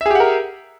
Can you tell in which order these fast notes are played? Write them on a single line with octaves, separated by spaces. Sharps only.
E5 G#4 G4 F#5 A#4